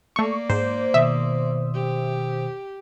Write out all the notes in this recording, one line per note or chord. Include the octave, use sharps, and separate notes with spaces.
A3 A#3 D5 C#6
G#2 C5
B2 D#3 E5 D#6
G4